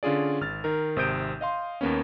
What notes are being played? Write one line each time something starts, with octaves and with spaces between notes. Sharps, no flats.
D3 C#4 F4 G#4 D5
G#1 F6 A6
D#3 A#4
G#1 C3 C5 D#6 G6 D7
D#5 F5 C6
D#2 A#3 B3 C#4